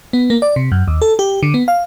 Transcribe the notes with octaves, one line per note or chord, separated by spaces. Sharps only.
B3
A#3
D5
C3
F#2
D#2
A4
G4
D3
B3
F5